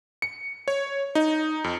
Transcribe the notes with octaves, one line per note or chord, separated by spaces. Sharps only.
C#7
C#5
D#4
F2